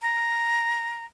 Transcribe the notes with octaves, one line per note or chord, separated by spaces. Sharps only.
A#5